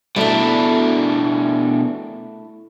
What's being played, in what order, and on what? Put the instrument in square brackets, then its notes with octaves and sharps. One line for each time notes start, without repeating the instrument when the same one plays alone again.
[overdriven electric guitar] B2 D4 [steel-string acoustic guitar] A3 E4